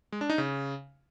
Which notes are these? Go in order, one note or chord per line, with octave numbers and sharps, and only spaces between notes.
G#3
D4
D#4
C#3